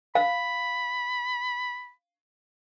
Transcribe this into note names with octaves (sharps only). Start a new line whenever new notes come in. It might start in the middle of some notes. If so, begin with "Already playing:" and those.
F5 B5